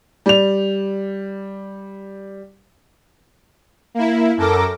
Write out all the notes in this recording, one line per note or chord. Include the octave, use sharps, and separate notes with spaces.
G3 F7
A#3 E4
F#2 A4 A#4 D6 A#6